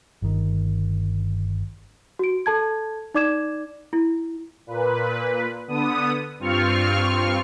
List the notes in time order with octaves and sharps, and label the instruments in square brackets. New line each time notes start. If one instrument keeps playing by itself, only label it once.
[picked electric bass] G1 D#3
[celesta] F#4 D7
A4 A5 G#6
D#4 D5 D6 G#6 E7
[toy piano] E4
[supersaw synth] A#2 B4
D3 B3 D#6
G2 C4 F4 C#6 F6